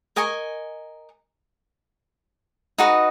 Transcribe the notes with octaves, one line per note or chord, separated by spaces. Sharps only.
A#4 D#5 G#5 C#6
D#4 F#4 B4 D#5